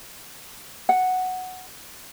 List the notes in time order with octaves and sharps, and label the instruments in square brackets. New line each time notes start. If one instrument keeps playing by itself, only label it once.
[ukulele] F#5